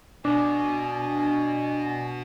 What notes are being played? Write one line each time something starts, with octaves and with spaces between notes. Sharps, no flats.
B2 D4 G#5